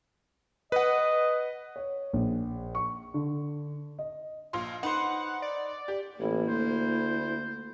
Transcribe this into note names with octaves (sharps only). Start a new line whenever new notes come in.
B4 D#5 F#5
C#5
A#1
C#6
D3
D#5
A#1 F4 C6
D#4 B4 C5 F#5
D5
G4
A1 A#3 E4
D2 C5